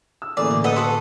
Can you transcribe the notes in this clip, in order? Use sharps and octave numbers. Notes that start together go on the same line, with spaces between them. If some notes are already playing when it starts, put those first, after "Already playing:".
E6
A2 D3 E3 A3 A#3 C#4 G#4 D5
B2
B3 A4 B4 D#5 D#6
F#4 A4 B4 A5 C6